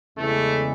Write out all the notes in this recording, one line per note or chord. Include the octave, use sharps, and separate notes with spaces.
E2 C#3 E3 G#3 A3